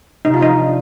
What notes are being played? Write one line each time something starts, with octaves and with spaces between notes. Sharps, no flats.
C3 D#4
F4
F3 D#4
D4